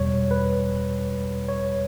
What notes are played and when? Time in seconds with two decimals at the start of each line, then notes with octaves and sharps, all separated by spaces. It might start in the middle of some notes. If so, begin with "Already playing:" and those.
Already playing: E2 B2 G3 C#5
0.31 B4
1.49 C#5